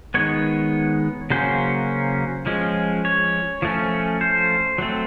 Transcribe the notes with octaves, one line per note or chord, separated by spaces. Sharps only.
D#3 G#3 B3 C#5
C#3 F#3 A#3 C#4 C5
F3 G#3 C#4
C#5
F3 A3 C#4
C5
F#3 A3 C4